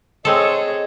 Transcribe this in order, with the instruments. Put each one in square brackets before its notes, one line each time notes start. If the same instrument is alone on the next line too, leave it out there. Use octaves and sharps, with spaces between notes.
[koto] G#3 C4 A4 [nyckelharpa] G#4 C#5 [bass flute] D#5